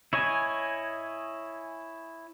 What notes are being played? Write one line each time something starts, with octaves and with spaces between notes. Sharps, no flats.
E4 C#5 D#5 G#5